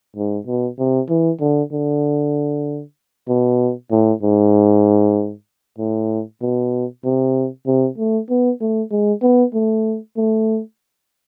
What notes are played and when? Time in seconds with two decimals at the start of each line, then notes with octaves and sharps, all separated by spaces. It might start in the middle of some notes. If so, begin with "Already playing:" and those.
0.16 G#2
0.47 B2
0.79 C3
1.09 E3
1.40 D3
1.73 D3
3.28 B2
3.91 A2
4.23 G#2
5.78 A2
6.42 B2
7.04 C3
7.67 C3
7.98 A3
8.30 B3
8.61 A3
8.91 G#3
9.22 B3
9.54 A3
10.17 A3